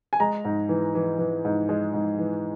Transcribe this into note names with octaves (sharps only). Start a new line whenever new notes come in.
G#5
G#3 A#5
G#2
E3
E3
E3
G#2
G#3
G#2
E3